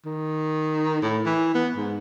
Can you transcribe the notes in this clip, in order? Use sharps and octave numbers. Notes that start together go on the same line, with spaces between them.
D#3
A2
E3
B3
G#2